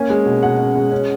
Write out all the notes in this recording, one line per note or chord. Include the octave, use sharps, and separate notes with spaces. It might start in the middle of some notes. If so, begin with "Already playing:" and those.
Already playing: A#3 C#4 G#5
G#3
B2
B2 F#5
C#4
G#3
C#4